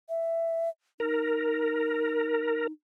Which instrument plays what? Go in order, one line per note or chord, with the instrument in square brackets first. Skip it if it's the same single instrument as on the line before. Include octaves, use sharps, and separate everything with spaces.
[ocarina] E5
[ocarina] D#4 [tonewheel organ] A#4